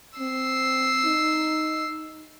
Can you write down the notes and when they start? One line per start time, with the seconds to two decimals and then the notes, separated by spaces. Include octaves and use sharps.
0.19 C4 E6 C7
1.05 D#4